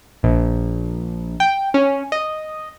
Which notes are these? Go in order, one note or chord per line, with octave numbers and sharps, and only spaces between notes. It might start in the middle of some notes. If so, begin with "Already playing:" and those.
A#1
G5
C#4
D#5